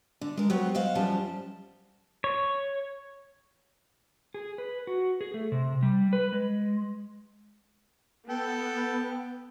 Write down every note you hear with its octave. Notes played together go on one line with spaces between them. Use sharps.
D3
G#3 A#4
F#3 B3 G4 C5 C#5
C5 D#5 F5 F#5
F#2 F3 G3 G4 A5
C#5
G#4
B4
F#4
G#4
A3
C3
G3
B4
G#3
B3 A4 G5